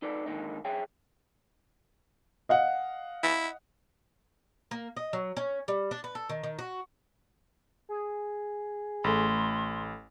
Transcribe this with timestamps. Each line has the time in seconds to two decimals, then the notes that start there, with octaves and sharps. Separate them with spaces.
0.02 D#4 A4 B4 D5
0.26 G#2 D3 D#3 A#3 D#4
0.65 G#4 C#5 E5 G5
2.49 D#5 F5 F#5
3.23 E4
4.71 A#3
4.97 D#5
5.13 F#3
5.37 C#4
5.68 G3
5.91 D4
6.04 B4
6.15 A4
6.29 D#3
6.43 D#3
6.59 F#4
7.89 G#4
9.04 A1 A3 B5 C6